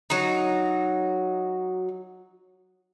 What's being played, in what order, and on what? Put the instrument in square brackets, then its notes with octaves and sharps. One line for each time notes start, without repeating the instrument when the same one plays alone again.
[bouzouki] F#3 D#4